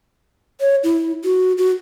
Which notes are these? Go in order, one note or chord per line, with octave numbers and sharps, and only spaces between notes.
C#5
E4
F#4
F#4